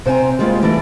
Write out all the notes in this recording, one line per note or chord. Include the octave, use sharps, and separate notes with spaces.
C3 C5 G5 G#5 A#5
G3 G#3 A#3 C#4 E4 F4
E3 G3 A3 D4 E4